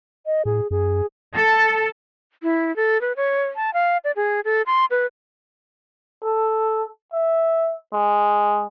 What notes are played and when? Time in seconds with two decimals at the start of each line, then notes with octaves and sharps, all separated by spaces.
0.26 D#5
0.45 A2 G#4
0.71 F#2 G#4
1.34 A4
2.43 E4
2.76 A4
3.01 B4
3.17 C#5
3.56 A5
3.74 F5
4.04 D5
4.16 G#4
4.45 A4
4.66 C6
4.91 B4
6.24 A4
7.13 E5
7.93 G#3